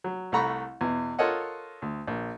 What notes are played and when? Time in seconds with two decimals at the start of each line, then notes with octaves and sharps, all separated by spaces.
0.04 F#3
0.32 C2 A3 F#5 A#5 B5 C#6
0.81 E2 B2
1.19 F4 A4 A#4 C#5 D#5 F#5
1.82 D2
2.08 A#1